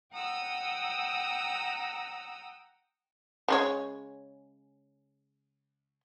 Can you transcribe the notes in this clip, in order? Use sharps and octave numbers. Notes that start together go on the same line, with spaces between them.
F#5 G5 A#5 D#6 E6
C#3 G#3 C#5